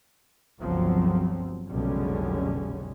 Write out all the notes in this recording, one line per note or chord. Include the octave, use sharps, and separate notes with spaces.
G1 C#2 F3 F#3 C4
F1 B1 D3 G3 G#3 C#4